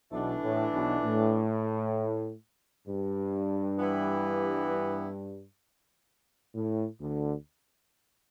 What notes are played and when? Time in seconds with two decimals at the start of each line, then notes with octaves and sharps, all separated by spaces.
0.12 B1 B2 E3 A3 D4
0.43 A2
0.73 B1 B2
1.04 A2
2.87 G2
3.79 E3 B3 E4 G4
6.54 A2
7.00 D2 D3